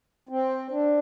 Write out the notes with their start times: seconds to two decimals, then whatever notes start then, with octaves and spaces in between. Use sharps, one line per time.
0.29 C4
0.71 D4